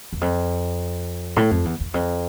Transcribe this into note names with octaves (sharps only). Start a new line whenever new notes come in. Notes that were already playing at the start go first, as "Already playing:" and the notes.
E2
F2
A2
F2
E2
E2
F2